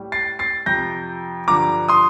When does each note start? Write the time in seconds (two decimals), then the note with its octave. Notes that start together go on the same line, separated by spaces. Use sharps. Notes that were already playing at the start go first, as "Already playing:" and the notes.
Already playing: A2 G3
0.12 A6 C7
0.39 A6 C7
0.66 F2 C3 F3 G6 A#6
1.48 G2 D3 F3 A#5 D6
1.89 C6 D#6